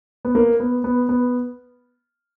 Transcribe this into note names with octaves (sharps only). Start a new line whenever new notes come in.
B3
A#3
B3
B3
B3